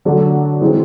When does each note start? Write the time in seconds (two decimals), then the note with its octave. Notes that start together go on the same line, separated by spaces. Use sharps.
0.05 D3 F#3 A3 D4
0.61 E3 G#3 C4